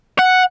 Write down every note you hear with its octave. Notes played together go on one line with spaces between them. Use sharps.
F#5